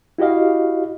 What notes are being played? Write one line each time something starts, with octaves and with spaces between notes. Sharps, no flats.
E4 F#4 G4 D#5 F5